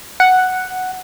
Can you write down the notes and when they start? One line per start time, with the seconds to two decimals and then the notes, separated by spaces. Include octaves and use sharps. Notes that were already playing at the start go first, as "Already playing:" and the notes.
0.20 F#5